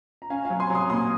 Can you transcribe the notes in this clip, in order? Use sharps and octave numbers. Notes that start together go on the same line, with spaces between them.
A#5
C#4 F5 G#5
F5 G#5
F#3
G#5 C6
F#3 C6 D#6
A#2 C6 D#6